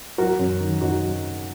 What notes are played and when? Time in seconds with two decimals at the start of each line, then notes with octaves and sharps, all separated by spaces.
0.18 F#3 F#4 A#4
0.39 F#2
0.60 D#3
0.81 F#2 D#4 F#4
1.03 F#3